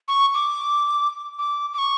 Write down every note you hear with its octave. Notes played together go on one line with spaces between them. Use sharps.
C#6
D6
D6
D6
C#6